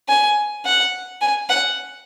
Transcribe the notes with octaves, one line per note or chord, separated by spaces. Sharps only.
G#5
F#5
G#5
F#5